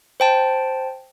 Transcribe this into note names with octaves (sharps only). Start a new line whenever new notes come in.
C5 G5 A5